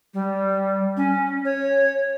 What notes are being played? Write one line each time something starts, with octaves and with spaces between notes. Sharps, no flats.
G3
C#4
C#5